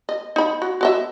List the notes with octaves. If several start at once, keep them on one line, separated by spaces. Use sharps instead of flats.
D#5
D#4 B5
F#4
F#4 D#5 E5